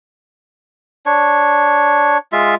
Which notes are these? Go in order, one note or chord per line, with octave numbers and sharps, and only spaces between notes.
D4 C#5
G#3 F4 E5